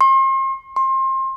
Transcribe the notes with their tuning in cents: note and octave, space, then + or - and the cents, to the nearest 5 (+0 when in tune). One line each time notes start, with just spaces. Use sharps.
C6 +40
C6 +30